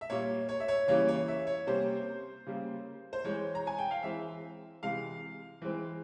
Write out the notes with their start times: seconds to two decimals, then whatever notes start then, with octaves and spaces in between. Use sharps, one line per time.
0.01 E5
0.10 A#2 G3 A#3 C#5
0.49 C#5
0.60 E5
0.68 C#5
0.88 C#3 E3 G3 A#3 C#4 C#5
1.08 C#5
1.28 E5
1.47 C#5
1.67 C3 G3 A#3 C#4 C5
2.46 C#3 G3 A#3
3.13 C5
3.24 E3 G#3 C4 C#5
3.55 A#5
3.67 G#5
3.78 G5
3.91 F5
4.03 E3 G#3 C4 E5
4.83 C3 E3 G#3 F5
5.62 E3 G#3 C4